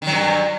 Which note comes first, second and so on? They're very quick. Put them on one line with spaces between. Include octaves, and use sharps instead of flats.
D#3 F#3 G2